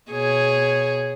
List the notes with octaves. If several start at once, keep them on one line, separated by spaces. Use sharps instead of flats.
B2 G#4 C#5